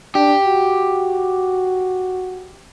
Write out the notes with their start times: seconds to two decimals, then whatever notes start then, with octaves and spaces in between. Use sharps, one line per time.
0.15 D4 G4
0.45 F#4